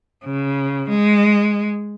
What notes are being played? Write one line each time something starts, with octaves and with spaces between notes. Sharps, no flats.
C#3
G#3